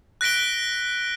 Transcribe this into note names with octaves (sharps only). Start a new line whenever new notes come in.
F#6 A#6 B6 D7 G7